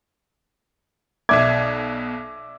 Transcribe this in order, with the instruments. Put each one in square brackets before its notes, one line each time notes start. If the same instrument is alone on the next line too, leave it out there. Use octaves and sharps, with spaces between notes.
[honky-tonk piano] B1 B2 G#6 [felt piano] D5 E5 D6